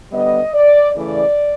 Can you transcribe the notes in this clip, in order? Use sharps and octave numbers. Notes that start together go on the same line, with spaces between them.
D3 G3 B3 D#5
D5
C#3 E3 A3 D5